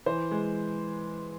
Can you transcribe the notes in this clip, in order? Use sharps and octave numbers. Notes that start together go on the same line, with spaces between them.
E3 C5
G#3